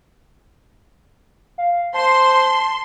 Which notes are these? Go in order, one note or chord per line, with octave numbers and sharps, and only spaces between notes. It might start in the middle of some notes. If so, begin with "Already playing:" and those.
F5
C5 A5 C6